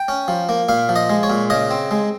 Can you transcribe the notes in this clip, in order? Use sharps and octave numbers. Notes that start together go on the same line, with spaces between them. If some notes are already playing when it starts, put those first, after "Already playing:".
Already playing: G5
C#4
F3
A#3
A#2 F5
F3
D#5
G#3
C#5
A#2
C#3 D#5
C4
G#3